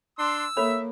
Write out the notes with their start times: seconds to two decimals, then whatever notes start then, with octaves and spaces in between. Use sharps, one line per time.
0.19 D4 C6 E6
0.57 A#3 A4 C#5 E5 B5